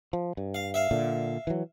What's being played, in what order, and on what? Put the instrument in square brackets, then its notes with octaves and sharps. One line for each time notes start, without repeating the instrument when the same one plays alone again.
[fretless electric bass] F3
G2
[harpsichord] F5
E5 F5
[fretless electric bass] A#2 D3
E3 F#3